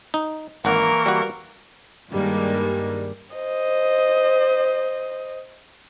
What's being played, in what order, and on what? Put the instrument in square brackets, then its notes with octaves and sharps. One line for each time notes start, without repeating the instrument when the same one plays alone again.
[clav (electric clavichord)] D#4
[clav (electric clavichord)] G#1 F#5 [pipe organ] E3 A#3 C#6 [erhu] A#4
[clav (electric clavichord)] G3 F#4
[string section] G2 D#3 G3 G#3 A#3
[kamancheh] C5 D#5